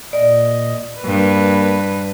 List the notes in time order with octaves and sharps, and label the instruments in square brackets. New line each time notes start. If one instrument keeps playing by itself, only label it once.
[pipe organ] A#2 D#5 [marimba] D5
[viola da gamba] G2 B4 [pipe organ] A#3